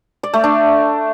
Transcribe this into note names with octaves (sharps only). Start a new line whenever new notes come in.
D5
A3
D4